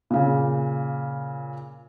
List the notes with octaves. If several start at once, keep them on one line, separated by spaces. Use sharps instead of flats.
A#2 C#3